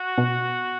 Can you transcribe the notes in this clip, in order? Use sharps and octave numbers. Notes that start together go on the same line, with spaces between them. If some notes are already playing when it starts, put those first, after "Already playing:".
Already playing: F#4
B2